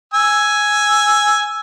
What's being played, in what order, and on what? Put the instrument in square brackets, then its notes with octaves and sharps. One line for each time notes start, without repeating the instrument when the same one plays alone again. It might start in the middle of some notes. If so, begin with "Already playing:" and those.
[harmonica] G#5 E6